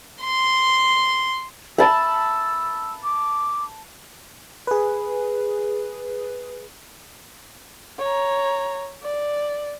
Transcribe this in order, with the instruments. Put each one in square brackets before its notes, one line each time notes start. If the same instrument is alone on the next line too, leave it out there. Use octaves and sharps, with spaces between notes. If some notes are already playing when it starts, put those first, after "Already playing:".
[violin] C6
[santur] A5 B5 [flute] E6
[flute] D6
[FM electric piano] G#4 B4
[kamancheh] C#5 A#5
D5